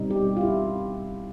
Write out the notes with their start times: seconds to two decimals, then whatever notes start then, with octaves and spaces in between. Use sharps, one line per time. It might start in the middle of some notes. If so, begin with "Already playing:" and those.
Already playing: B2 G3 C4 D#4
0.11 G4
0.37 F4
0.41 E4